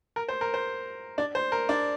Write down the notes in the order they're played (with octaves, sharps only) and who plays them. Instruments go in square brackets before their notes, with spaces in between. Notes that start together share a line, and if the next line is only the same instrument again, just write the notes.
[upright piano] A#4
C5
A#4
C5
D4 D5
C5
A#4
D4 D5